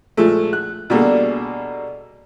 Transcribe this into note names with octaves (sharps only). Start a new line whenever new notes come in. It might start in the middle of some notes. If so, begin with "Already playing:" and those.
A#2 F3 G#3 A3
F#6
B2 G3 A#3 D4 G#4 A4